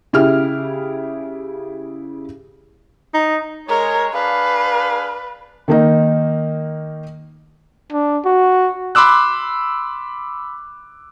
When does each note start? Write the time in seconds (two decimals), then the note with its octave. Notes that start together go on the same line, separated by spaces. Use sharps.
0.13 C#3 E4 G4 G#4 F6
3.14 D#4
3.69 G#3 A#4 C#5
4.13 D4 G#4 B4 F5
5.68 D#3 A#3 D#4
7.92 D4
8.25 F#4
8.95 B5 C6 D6 E6 F#6